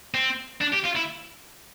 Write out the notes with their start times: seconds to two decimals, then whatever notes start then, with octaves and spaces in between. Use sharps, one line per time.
0.14 C4
0.62 D4
0.74 G4
0.85 F4
0.97 E4